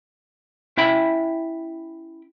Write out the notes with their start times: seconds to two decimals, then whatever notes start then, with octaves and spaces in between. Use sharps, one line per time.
0.77 C#4 E4 E5 G5 B5